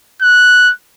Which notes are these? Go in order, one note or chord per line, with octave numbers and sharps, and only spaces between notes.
F#6